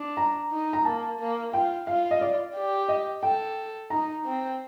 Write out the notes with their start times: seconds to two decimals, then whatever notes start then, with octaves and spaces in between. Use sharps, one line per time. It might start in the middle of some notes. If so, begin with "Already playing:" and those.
Already playing: D4
0.17 A#5
0.52 D#4
0.73 A#5
0.85 A#3 A5
1.19 A#3
1.52 F4 G5
1.87 F4 F5
2.11 D#5
2.21 D5
2.55 G4
2.88 D#5
3.22 A4 G5
3.90 D#4 A#5
4.25 C4